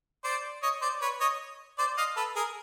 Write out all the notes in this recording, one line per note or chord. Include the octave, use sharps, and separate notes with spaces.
C5 D5
C#5 D#5
C5 D5
B4 C#5
C#5 D#5
C5 D5
D#5 F5
A4 B4
G#4 A#4